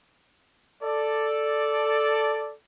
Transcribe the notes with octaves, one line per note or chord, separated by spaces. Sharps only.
A4 D5